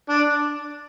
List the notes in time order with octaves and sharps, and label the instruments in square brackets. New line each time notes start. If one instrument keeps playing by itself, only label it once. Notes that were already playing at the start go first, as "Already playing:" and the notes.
[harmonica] D4